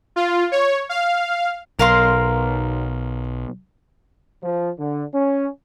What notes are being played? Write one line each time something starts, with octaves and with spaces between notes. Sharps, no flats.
F4
C#5
F5
B1 A#4 F5 C6
F3
D3
C#4